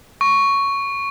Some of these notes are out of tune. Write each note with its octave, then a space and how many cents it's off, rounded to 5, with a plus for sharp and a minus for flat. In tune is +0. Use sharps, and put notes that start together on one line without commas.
C#6 +5